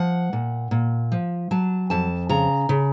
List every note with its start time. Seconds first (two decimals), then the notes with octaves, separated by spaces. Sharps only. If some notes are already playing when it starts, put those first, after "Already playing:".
Already playing: F3 F#5
0.33 A#2
0.71 A#2
1.12 F3
1.51 F#3 A5
1.90 F2 A5
2.29 C#3 A#5
2.69 C#3